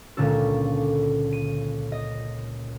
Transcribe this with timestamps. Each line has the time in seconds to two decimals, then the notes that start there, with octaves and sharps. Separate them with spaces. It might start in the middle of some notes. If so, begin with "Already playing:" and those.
0.17 C#2 A#2 D3 C#4 A4
1.32 D#7
1.92 D#5